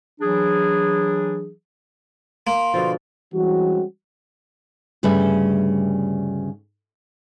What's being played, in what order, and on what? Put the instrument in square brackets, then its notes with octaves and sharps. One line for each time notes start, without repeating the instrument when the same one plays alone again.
[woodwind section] E3 F#3 D4 G#4
[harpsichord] A#3 [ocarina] C6
[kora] B2 D3 F3
[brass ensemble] E3 G3 G#3 C4 C#4 F#4
[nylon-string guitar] D2 G2 C#3 G3 B4 E5